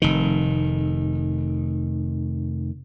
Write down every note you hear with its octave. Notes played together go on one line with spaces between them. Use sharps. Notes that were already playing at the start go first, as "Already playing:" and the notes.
F1 D#3